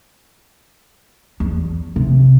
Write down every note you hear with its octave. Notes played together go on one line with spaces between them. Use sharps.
E2
C3